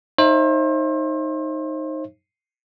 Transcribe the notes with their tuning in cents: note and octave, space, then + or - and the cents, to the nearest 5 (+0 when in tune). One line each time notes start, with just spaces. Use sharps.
D#4 +0 C5 +35 E5 +20